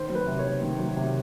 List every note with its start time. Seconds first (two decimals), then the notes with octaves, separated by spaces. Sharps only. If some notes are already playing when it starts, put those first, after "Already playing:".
Already playing: D#3 C5
0.09 F#3
0.15 B4
0.27 C3
0.39 C#5
0.44 D#3
0.62 D#3
0.79 F#3
0.96 C3